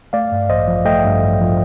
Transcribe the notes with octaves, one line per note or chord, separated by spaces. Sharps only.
A3 D5 F5
G2
A1 C5 D#5
F3
A3 D#5 G5
G2
A1
F3